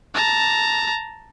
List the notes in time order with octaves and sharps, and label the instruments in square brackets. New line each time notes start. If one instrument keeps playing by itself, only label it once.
[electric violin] A5 A#5